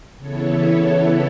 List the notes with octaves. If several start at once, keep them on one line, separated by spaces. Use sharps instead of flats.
C#3 E3 B3 E4 A4 C#5
A4